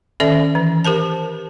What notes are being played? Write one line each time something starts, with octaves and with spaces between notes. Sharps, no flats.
D#3 C#4 A4 D5 E5
E3
G4 A#4 C5 A5